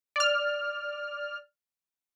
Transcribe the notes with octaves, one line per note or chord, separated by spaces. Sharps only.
D5 F6